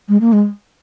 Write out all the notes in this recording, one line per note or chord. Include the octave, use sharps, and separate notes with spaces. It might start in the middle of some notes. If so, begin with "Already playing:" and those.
G#3
A#3
G#3